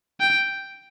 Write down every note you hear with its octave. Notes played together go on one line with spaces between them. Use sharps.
G5